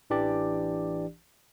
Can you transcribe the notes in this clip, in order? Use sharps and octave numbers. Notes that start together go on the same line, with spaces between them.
A1 E3 D4 G4 D5